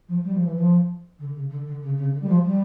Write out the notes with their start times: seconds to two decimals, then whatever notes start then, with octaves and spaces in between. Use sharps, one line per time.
0.09 F3
0.24 G3
0.34 F3
0.45 E3
0.56 F3
1.19 D3
1.34 C#3
1.50 D3
1.66 D3
1.82 C#3
1.97 C#3
2.13 D3
2.22 G3
2.29 F3
2.45 G3